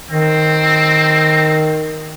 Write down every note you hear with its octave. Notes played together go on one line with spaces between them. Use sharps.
D#3 C4